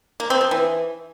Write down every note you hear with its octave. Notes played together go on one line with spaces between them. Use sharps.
A#3
C4
F3
E3